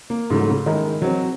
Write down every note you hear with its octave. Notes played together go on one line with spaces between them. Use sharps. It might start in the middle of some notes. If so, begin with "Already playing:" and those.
A#3
G#2 C#3 F#3 A3
C#3
D#3 G#3 D#4 E4 A#4
F#3 C4